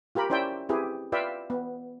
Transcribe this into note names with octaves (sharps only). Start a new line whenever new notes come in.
F4 G4 A#4 B5
C#4 E4 C5 D5 E5 G5
C4 E4 G4 G#4 B4
F4 B4 D5 E5 F5 G5
B3